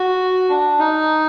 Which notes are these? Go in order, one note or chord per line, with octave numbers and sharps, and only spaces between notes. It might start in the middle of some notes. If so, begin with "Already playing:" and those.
Already playing: F#4
D4
D#4